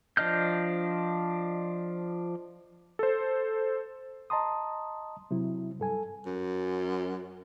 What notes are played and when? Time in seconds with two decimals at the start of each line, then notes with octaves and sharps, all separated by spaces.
0.17 F3 D4 D#5 F6 G6
2.99 A4 C5
4.30 D#5 A5 A#5 C6 D#6
5.31 C3 F#3 E4
5.80 G2 A4 G#5
6.26 F#2